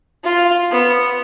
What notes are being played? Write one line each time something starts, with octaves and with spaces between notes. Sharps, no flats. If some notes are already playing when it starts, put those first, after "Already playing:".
F4
B3